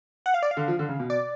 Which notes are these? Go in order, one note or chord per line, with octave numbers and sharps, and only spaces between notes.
F#5
F5
D5
F5
D3
F3
D3
C#3
B2
D5